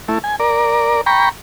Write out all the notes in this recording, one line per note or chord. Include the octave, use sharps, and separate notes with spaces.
A3 E4
G#5
A#4 D5
G5 A#5 B5 C#6